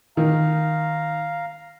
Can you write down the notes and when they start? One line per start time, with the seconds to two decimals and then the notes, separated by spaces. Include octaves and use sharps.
0.17 D#3 F5 A#5